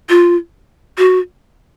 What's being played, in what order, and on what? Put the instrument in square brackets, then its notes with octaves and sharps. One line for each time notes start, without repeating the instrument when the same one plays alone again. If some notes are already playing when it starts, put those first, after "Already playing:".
[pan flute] F4
F#4